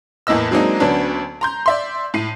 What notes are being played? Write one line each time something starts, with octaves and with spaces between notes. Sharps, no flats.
E2 A2 A#3 D#5 E6
F#3 G#3 A#3 C4 D4 D#4
D2 F#3 B3 C#4 D4
A#5 C6 G6
D5 E5 C6
A2 C7 D#7